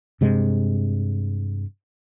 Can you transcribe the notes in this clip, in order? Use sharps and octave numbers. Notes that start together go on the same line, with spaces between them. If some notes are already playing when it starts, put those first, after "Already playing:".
G2 C3 G#3